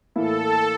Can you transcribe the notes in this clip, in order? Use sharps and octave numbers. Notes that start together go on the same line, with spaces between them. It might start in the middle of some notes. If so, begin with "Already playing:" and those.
A2 E3 A#3 E4 A4